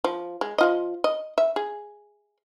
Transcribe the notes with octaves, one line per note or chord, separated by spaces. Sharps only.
F3
G#3
F3 F4 D#5
D#5
E5
G#4